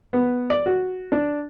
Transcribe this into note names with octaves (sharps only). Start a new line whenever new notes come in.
B3
D5
F#4
D4